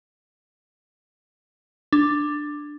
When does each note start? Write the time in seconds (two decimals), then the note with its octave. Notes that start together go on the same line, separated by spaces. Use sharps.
1.93 D4